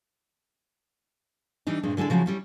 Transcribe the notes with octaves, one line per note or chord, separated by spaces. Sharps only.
E3 G3 D4 D#4
G2 A#2 G#3 C4
D3 G#3 E4 A4 D5
C#3 F3 F#3 G#3 E4
G3 C#4 E4